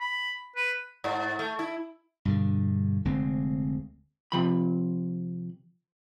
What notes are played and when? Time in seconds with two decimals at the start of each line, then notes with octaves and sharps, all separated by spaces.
0.01 B5
0.56 B4
1.04 G#2
1.39 A3
1.59 E4
2.25 G2 B2 D3
3.05 F1 D2 G#3 C4
4.32 C3 F3 B5